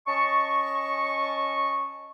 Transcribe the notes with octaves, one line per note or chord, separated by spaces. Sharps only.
C#4 D#5 A5 C#6